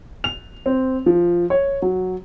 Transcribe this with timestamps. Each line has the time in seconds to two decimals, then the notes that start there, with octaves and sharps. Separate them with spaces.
0.24 F7
0.66 C4
1.06 F3
1.50 C#5
1.82 F#3